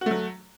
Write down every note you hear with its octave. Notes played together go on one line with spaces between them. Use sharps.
F#3 A3 F#4